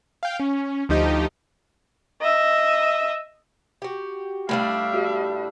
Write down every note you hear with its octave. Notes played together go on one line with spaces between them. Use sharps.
F5 G5
C#4
D2 F3 D#4 G4 D#5
D#5 E5
F#4 G4
A2 G3 A3 D4 E5 F5
F#4 G4